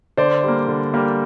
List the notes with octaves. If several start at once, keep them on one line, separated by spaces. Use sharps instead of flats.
D3 C5 D5
G3 A#3
D3
G3 A#3